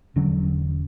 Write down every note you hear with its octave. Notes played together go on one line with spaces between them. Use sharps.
E1 D3 F#3 C#4